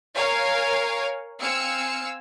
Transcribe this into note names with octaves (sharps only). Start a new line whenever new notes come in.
A#4 C#5 F5 G#5
C4 F5 G#5 E6 C#7